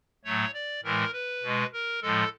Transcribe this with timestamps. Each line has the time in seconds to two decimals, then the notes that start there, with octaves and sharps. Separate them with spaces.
0.24 A2 F#3 A3 C#5
0.54 D5
0.83 A2 E3 G#3 A#4
1.13 B4
1.43 B2 G#3
1.73 A#4
2.02 A2 F3 G#3 A4